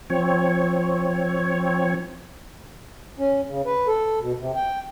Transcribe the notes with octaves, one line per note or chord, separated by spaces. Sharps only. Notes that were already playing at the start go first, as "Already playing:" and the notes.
F3 C4 C#5
C#4
C#3
B4
A4
B2
C3
G5